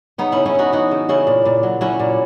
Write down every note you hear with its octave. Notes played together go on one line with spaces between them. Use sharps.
C#3 B3 D#4
C#3 C#4 E4
C#4 E4
E3 D#4 F#4
E3 D#4 F#4
C#3
C#3 C#4 E4
A#2
A#2
F#3
F#3 C#4 E4
A#2